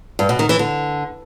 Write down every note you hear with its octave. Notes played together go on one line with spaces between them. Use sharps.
G2
B2
D#3
E3
D3